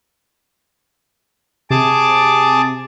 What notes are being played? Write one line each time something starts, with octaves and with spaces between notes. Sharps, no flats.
C3 G#4 A5 D6